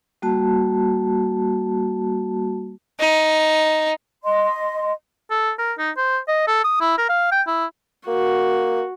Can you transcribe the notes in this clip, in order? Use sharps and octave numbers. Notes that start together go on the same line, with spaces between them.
G3 A#3 F#4 A5
D#4
D#5 C6
A4
A#4
D#4
C5
D#5
A4
D#6
E4
A#4
F5
G5
E4
A#3 F#4